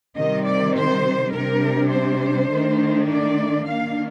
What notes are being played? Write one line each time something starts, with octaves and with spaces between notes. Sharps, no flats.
C3 D#3 G3 C4 D#5
D5
C5
C3 G3 D4 A#4
C5
D#3 A3 D4
D5
D#3 A#3 D4 F5